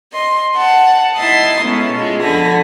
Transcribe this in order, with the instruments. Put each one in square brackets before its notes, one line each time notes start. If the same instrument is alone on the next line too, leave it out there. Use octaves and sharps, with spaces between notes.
[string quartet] D#5 C6
F#5 A5
D#4 E4 E5 A5 C6 D#6
G#3 A3 B3 C#4 E4
B2 G#3 F4
F2 D3 A4 G#5 B5 A#6